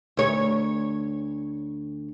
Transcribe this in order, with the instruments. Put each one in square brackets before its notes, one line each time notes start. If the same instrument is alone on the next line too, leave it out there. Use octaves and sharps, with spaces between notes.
[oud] D2 C#5